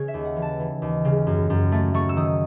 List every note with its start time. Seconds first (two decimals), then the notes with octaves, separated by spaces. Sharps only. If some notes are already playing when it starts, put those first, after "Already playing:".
Already playing: C#3 C#5
0.08 E5
0.14 D#2
0.25 F#5
0.36 E3
0.42 A5
0.60 E3
0.82 D#2
1.05 C#3
1.27 F#2
1.50 F#2
1.72 A3
1.94 A3 C#6
2.09 E6
2.16 D#3 D#6